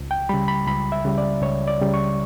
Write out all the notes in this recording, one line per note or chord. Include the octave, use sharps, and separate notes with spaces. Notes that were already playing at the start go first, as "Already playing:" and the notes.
Already playing: C#2
G5
C#3 G3 B5
B5
C#2 B5
E5
C#3 G3
D5
C#2 C#5
D5
C#3 G3
C#6